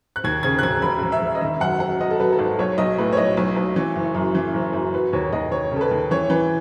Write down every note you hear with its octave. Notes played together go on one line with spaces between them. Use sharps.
F#6
D#2 G#6
C#3 G#6
F#6
E1 G#6
E1 B5
E1
E5
E1
D#5
D#3 E5
F#2 F#5
F#3 F#5
F#3 D#5
A4
F#3 B4
A4
G#1 B4
B1 C#5
B1 D#5
A2 B4
C#5
B1 D#5
B1
B1
E3
F#1
F#2
E3
F#1
F#2
F#3 B4
D#2 C#5
D#2 D#5
D#2 C#5
C#3 A4
B4
D#2
E3 C#5
E3 B4